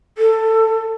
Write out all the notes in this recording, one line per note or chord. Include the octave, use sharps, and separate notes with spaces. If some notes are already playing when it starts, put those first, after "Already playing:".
A4